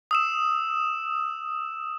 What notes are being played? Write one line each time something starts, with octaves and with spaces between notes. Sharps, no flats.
D#6 E6 E7